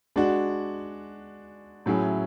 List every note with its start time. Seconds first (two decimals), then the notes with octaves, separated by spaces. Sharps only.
0.16 G#3 D4 F#4
1.86 A2 F#3 C#4 E4 G#4